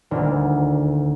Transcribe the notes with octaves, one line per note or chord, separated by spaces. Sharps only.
D#1 D2 D3 D4 F4 A#4